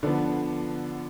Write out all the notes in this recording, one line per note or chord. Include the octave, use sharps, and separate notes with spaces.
D3 F3 B3